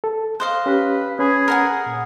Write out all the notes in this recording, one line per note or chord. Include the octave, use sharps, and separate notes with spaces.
A4
C5 D#5 F5 F#6
C#4 G4 B4
C#4 G#4 B4 B5
A#4 F#5 G#5
A#2